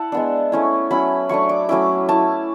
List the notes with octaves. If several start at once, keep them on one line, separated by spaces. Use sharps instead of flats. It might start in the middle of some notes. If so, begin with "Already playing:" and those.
Already playing: E4 F#5 A5
G#3 B3 D4
A3 C#4 E4
F#3 C#4 E4 B5
F#3 A3 D4 C#6
D6
F#3 A3 C#4 E4 D6
A3 E4 A5